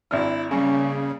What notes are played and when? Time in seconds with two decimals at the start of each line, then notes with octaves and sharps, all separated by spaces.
0.11 G#1 D4 E4 F6
0.51 C#3 G3 A#3 C#4